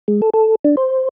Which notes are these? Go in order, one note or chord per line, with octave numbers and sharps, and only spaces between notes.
G#3
A4
A4
D4
C5